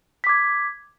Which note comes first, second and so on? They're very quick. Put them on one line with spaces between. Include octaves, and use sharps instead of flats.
B6 D6 G#6